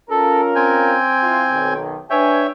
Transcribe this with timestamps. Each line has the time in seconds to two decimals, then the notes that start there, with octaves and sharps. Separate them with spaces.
0.10 C#4 F4 A4 A#4
0.55 C4 G5 G#5
1.23 E4 F4
1.51 B1 D#3
2.10 D4 B4 C#5 E5 G5 G#5